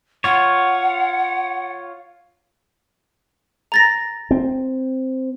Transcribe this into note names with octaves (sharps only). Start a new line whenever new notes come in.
F4 C#5 F#5
A#5 A6 A#6
C4